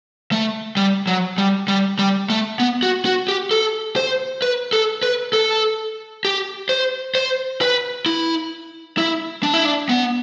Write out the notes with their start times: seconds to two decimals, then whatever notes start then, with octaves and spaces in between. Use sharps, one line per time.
0.32 A3
0.77 G3
1.07 F#3
1.38 G3
1.68 G3
1.99 G3
2.30 A3
2.60 B3
2.83 F#4
3.05 F#4
3.28 G4
3.51 A4
3.96 C5
4.42 B4
4.73 A4
5.03 B4
5.33 A4
6.25 G4
6.69 C5
7.15 C5
7.61 B4
8.06 E4
8.98 E4
9.43 D4
9.54 E4
9.65 D4
9.89 B3